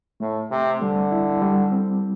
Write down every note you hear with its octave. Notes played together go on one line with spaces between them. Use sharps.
A2 A3
C3 C4
D3 G3
E4
G3
C4